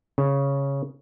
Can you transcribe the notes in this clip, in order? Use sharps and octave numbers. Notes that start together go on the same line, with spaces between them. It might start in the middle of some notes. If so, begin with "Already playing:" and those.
C#3